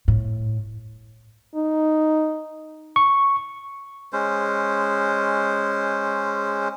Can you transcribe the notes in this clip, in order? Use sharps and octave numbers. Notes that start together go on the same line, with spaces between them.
A2
D#4
C#6
G#3 C#4 C5